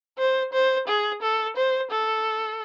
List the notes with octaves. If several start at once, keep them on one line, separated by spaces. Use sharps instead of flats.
C5
C5
G#4
A4
C5
A4